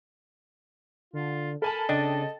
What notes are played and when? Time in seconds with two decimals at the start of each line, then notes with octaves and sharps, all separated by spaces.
1.13 D3 F4
1.62 A4 A#4 G#5 A5 B5
1.89 C#3 D4 D#5 G5 A6